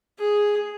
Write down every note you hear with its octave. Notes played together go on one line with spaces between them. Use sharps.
G#4